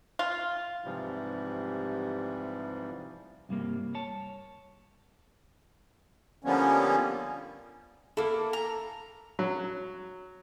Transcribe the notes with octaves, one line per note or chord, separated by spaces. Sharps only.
F4
G#2 C3 E3 F3 G3
C2 G2 G3 A#3
C#5 A5
D3 F3 G3 A#3 B3 C#4
A#3 E4 A4
A#5
F#3